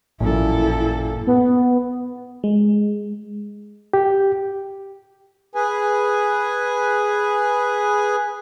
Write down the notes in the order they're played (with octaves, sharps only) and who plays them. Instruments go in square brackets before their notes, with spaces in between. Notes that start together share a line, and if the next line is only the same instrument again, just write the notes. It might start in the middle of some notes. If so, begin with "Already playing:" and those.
[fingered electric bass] A1 F3 [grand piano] F#2 A#2 [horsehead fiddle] E4 A4
[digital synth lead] B3
[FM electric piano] G#3
[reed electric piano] G4
[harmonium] G#4 B4 G#5